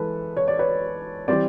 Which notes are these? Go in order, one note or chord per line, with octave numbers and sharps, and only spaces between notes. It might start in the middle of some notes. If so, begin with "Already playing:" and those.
Already playing: E3 G#3 A4 B4
C#5
D5
B4 C#5
E3 G3 C4 C5 D5